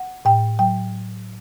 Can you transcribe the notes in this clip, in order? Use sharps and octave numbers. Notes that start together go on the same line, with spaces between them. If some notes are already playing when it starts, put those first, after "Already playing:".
Already playing: F#5
A2 G5
F#3 G5